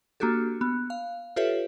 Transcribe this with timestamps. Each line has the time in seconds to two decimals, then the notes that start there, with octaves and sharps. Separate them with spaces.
0.20 A#3 D4 F#4 G4 A4
0.61 B3
0.90 F5
1.36 F4 G4 A4 B4 C#5 E5